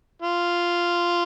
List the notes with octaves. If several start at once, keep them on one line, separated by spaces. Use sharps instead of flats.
F4